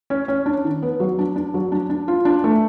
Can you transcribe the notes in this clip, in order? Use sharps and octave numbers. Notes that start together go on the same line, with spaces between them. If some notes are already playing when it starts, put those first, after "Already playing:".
C#4
C#4
D4
D#3
B3
F#3
D4
D4
F#3
D4
D4
F4
D4
A3